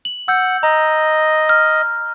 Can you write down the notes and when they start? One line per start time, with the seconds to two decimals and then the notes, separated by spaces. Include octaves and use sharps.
0.05 F#7
0.28 F#5 E6 G6
0.63 D#5 A#5
1.49 F6